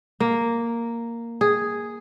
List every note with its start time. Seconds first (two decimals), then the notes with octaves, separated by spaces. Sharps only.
0.20 A#3
1.41 G#4